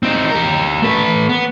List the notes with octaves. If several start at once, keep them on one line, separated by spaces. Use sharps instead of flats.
C4 D#4
G4 A#4
A3 B4
B3